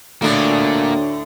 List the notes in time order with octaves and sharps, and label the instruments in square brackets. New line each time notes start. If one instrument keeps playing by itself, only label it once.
[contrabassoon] D2 [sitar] A2 D3 D4 [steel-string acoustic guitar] A3 [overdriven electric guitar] A#3 D5